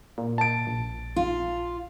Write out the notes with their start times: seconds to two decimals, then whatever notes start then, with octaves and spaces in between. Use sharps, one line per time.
0.18 A#2
0.38 A5 D7
0.67 A#1
1.16 F4